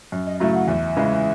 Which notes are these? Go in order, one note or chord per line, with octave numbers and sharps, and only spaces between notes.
F#2
D#5
C#3 F#3 A3 E4 E5
F#5
E2 E5
C#3 E3 G#3